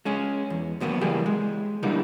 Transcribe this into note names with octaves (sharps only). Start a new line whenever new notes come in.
G#3 C#4 G#4
E2
D#2 F#3 A#3 B3
C#2 E3 G3 A#3 G4 G#4
G#3
D3 E3 G3 A#3 D#4